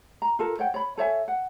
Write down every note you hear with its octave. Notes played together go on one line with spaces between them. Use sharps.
A#5
F4 A4 A#4
C#5 F#5 G5
C#5 B5
A4 C#5 E5 G#5
F#5